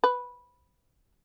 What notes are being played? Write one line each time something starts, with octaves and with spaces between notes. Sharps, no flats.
B4